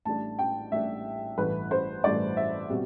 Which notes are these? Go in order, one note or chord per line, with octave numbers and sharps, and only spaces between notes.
A1 A2 G3 D4 A5
G5
A1 A2 G3 D4 E5
A1 G2 E3 A3 B4
C5
A1 G2 E3 A3 D5
E5
B2 G3 C4